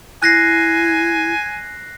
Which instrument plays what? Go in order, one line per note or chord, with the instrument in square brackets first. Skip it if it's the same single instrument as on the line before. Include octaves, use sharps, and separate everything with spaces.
[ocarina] E4 [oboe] G#5 [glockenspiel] F#6 A#6 C7